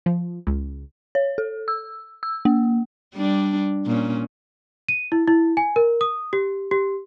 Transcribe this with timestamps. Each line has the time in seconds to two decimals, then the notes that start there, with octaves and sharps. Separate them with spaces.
0.06 F3
0.47 C#2
1.15 C#5
1.38 A4
1.68 E6
2.23 E6
2.45 A#3
3.15 G3 D4
3.86 A#2 C#4
4.89 D#7
5.12 E4
5.28 E4
5.57 G#5
5.76 A#4
6.01 D#6
6.33 G4
6.71 G4